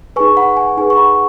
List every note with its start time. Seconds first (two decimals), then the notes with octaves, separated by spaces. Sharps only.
0.16 D#4 G#4 B4 G#5 C#6
0.37 F#5 B5
0.57 G#5
0.77 D#4 G#4 B4 G#5
0.90 C#6
0.97 F#5 B5